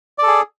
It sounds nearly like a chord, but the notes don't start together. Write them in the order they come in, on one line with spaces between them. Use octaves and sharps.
D5 A4 G#4